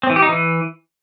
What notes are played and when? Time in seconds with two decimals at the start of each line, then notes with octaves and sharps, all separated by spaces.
0.03 C4
0.10 E3
0.16 G4
0.22 D#4
0.29 E3